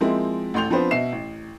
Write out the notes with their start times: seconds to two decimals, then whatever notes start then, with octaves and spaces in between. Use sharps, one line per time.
0.01 F3 G#3 A#3 C4 E4
0.54 A1 D2 C6 G6 F7
0.70 F3 B3 C4 D4 B4 C5
0.91 B2 D#5 E5 C7 E7
1.12 A1